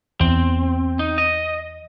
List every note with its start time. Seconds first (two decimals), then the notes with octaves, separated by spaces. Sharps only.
0.21 E2 C4
0.99 D#4
1.18 D#5